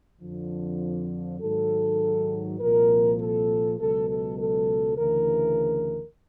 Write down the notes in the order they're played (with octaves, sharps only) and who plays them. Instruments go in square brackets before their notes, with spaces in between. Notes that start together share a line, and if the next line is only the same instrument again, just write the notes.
[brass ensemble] F2 D3 F3
G#2 D#3 F#3 A4
C2 A#2 F3 A#4
A4
C#2 B2 F#3 A4
A4
A4
D2 C#3 E3 A#4